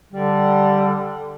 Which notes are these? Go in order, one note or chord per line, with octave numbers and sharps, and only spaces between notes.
D3 G3